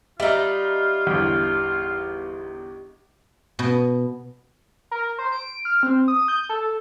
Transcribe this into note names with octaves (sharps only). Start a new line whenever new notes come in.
G3 D#4 F4 E5
G1 E2
B2
A#4
C5
D7
F6
C4
D#6
G6
A4